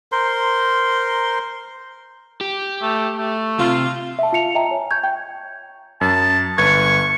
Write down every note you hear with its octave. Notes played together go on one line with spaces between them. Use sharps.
A#4 C5 C6
G4
A3
A3
C3 F4
E5 F#5 A5
F4 F5 C#7 F7
D#5 E5 G5 A5 A#5
C#5 G#5
C#6 G6 G#6
G5
F#2 A5
G1 B4 C#6 G#6